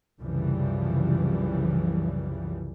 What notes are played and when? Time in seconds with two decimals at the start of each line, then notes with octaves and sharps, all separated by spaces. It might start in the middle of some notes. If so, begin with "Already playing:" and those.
0.20 C2 F#2 C#3 E3 F3 G3